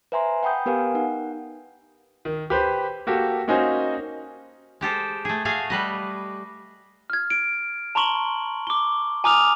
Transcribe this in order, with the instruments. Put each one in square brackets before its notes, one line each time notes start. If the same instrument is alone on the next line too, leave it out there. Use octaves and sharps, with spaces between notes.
[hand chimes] B4 C5 E5 G#5 A#5 C6
F#5 G5 B5 D#6 G6
B3 G4 A#4 B4 F5 G#5
D#4 F#5
[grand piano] D#3
G4 B4 C5
A#3 F#4 G4 A4
A#3 C#4 D#4 F#4 C5 G#5
[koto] G#3 G4 A4 C5
A3 G#4
A3 F#4 G#4 F5 G#5
G3 B4 D#5
[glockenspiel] F6 G#6
D7
A5 A#5 C6 C#6 F#7 G7
D6 G7
G#5 A#5 D6 D#6 F6 F7